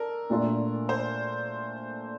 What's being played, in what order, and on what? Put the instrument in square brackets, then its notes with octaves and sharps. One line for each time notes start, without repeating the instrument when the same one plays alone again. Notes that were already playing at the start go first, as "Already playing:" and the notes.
Already playing: [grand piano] D4 A4 [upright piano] A#4
[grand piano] A#2 A3 D4 F4 A4
[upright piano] C5